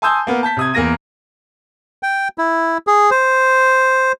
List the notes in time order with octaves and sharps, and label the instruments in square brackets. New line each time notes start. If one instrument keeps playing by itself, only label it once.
[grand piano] G#5 A5 C6 D#6 E6 G6
A#3 B3 A#4
A5 G6 B6
C3 D#6 G#6
E2 A#3 A#4 A#6 D#7
[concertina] G5
E4
G#4
C5